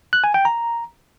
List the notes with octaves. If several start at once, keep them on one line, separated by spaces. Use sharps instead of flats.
F#6
G#5
G5
A#5